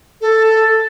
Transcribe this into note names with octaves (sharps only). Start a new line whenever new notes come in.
A4